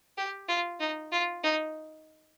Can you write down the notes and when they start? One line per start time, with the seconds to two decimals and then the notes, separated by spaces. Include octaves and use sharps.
0.17 G4
0.48 F4
0.80 D#4
1.12 F4
1.43 D#4